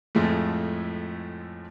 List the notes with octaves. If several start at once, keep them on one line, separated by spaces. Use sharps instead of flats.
F2 A2 F3 G#3 A3